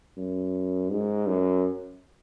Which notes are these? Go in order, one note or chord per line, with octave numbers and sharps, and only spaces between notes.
F#2
G#2
F#2